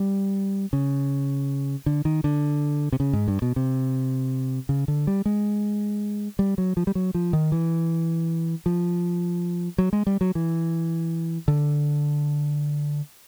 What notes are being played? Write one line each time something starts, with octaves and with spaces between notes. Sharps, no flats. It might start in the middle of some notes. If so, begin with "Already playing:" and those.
Already playing: G3
C#3
D3
D#3
D3
C3
C#3
G#2
G2
B2
C3
C#3
D3
G3
G#3
G3
F#3
F3
G3
F#3
F3
D#3
E3
F3
F#3
G#3
G3
F#3
E3
D3